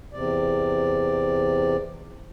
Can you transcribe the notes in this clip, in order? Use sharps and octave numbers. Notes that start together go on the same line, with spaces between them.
E2 C3 D5